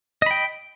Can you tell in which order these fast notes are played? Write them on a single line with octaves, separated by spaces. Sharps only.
D#5 B5 G5